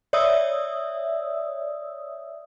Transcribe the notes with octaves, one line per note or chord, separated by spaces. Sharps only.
C#5 D5 E5 D#6 E6